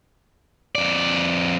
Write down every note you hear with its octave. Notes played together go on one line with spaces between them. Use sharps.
F2 D5